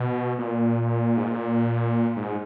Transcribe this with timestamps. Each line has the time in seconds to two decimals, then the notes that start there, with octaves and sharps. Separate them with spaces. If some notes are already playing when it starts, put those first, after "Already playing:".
Already playing: B2
0.39 A#2
1.17 G#2
1.27 A#2
2.16 G#2